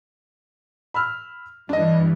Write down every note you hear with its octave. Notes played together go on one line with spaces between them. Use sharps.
B5 E6 F6
G2 E3 D4 D#5